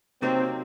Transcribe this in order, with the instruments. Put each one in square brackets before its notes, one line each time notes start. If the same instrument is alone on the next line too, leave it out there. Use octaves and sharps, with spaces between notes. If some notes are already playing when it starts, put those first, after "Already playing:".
[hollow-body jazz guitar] C3 F#3 A#3 D#4 [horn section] C4